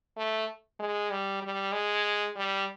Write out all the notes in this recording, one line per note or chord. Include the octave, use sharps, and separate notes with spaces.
A3
G#3
G3
G3
G#3
G3